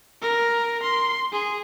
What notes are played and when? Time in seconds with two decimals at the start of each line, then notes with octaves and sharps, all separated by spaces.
0.22 A#4
0.83 C6
1.32 G#4